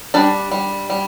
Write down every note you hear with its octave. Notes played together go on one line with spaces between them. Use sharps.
G3 D4 D5
G3
G3